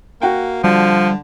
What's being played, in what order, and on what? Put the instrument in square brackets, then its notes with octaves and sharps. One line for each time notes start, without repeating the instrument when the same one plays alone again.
[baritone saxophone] A#3 [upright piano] F#4 G5
[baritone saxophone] D3 [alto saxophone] F3 [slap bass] G3